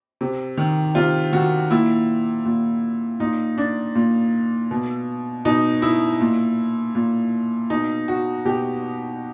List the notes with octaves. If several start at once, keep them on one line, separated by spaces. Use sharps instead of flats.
C3
D#3
C3 F4
D#3 F#4
A#2 E4
A#2
A#2 D#4
D4
A#2
B2
B2 D#4
E4
A#2
A#2
B2 D#4
F#4
B2 G4